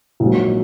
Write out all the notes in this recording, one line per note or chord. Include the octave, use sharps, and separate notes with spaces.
A#1 G#2 F#3